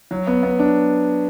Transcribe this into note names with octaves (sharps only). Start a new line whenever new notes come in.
F#3
B3
B3
D4